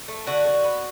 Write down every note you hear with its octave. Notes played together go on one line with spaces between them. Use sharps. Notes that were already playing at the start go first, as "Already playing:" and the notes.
A3
D3 F#4
D3
B3